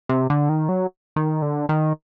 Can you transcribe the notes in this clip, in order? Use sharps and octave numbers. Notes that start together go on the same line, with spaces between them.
C3
D3
D#3
F#3
D#3
D3
D#3